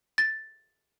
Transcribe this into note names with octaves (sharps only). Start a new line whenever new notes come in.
A6